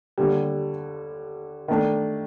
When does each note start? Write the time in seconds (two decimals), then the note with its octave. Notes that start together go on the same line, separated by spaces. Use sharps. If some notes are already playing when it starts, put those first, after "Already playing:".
0.18 D#2 D3 G3
1.68 D#3 A3 D4